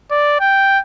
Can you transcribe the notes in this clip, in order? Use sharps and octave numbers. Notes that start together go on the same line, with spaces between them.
D5
G5